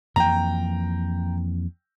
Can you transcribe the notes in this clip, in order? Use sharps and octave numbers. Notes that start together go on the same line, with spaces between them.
F2 E3 A#3 G5 A#5